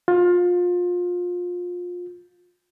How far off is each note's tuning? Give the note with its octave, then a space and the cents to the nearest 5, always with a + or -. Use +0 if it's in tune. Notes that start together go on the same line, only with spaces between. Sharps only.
F4 +25